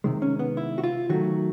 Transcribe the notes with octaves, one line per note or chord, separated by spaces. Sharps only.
C3 D#3 G#3
C#4
B3
E4
F#4
F4
D#3 F#3 A3 F#4